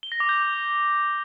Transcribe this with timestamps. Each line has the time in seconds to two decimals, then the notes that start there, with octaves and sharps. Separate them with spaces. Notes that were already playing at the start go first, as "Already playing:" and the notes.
0.03 G7
0.12 A#6
0.20 D6
0.29 G6